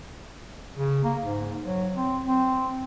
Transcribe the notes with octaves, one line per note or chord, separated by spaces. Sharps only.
C#3
A#3
G#2
F#3
C4
C4